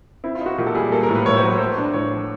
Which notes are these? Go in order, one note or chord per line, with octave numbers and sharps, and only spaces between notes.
C4 E4
F4
D#4
F#4
A#2 G4
A4
G3 G#4
A#3 A4
A#4
A2
B4
A2 C#5
C5
F#3 B4
A3 C5
D4
A2 C#5
F3